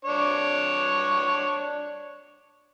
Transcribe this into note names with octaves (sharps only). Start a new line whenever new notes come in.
D4 C#5